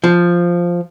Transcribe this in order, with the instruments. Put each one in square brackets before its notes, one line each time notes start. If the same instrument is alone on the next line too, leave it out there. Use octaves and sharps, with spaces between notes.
[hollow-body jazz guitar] F3